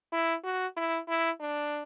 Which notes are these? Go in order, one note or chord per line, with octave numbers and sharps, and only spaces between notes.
E4
F#4
E4
E4
D4